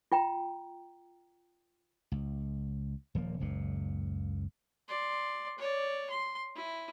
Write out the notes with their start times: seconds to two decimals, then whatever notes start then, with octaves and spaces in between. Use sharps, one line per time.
0.12 F4 G5 A#5
2.12 C#2
3.15 D#1 F3 G#3 A#3
3.40 F#1 C#2 A#2
4.88 D5 C6
5.58 C#5 D5
6.10 C6
6.56 E4